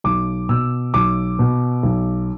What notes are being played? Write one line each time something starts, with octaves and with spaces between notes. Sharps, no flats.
B1 D6
B2 E6
B1 D6
B2
B1